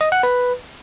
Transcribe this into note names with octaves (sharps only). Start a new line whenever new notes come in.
D#5
F#5
B4